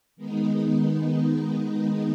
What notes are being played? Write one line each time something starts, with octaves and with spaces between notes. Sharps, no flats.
D#3 G#3 B3 D#4